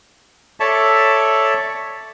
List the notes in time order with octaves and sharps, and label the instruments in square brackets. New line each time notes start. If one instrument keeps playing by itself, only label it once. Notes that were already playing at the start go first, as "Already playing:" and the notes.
[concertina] A4 C#5 D5 E5 A5